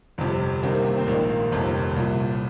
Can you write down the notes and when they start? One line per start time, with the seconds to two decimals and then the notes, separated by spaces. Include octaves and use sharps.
0.18 G1 F2 C3
0.63 C2 C3 D#3 C4
0.74 A#3
0.85 A#3
0.97 C4
1.07 A#1 G#2 D#3 A#3
1.29 A#3
1.52 G1 F2 C3 D#3
1.96 C2 A#2